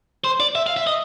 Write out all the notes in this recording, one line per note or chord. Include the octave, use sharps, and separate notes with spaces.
C5
D5
E5
F5
E5
D#5